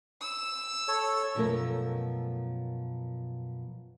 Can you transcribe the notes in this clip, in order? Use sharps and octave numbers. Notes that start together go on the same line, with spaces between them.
E6
A4 C#5
F#2 B2 F3 A3 A#4